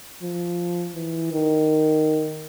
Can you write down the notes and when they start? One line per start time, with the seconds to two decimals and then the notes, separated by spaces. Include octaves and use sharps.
0.22 F3
0.95 E3
1.32 D#3